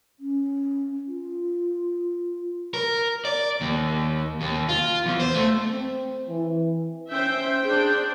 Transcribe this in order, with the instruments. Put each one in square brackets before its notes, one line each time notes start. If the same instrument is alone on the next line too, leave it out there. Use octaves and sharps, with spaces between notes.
[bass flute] C#4
F4
[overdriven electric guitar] A#4
D5
D#2
D#2
F4
E2
C5
A3
[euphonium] C4
E3
[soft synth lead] C#4 [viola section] C5 E5 [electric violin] G5 G6
[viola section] D4 C5 [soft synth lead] G#4